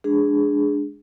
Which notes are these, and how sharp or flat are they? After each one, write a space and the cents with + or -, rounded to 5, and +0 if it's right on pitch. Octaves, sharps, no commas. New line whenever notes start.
G#3 +0 D4 +0 G#4 +0